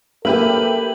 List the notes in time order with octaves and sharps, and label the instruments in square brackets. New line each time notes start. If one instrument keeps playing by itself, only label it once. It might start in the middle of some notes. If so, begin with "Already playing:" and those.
[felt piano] A#3 [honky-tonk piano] G4 B4 E5 [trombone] A4 [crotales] F#7